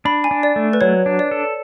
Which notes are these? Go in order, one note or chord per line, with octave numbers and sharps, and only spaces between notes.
D4 B5
G#5
D4
D5
A3
B4
F#3 C#5
D4
D5
A4